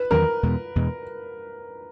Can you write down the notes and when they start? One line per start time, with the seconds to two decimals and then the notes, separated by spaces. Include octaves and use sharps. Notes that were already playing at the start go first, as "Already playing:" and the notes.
Already playing: B4
0.11 E2 D#3 F#3 C#4 A#4
0.43 E2 B2 G#3
0.75 E2 B2 G#3